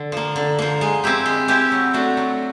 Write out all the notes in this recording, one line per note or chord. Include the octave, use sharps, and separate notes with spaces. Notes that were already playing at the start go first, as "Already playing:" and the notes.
Already playing: D3
F3 A#3
D3
F3 A#3
G#3
C4 E4 G4
G#3
C4 E4 G4
F#3
A3 D4 F#4
F#3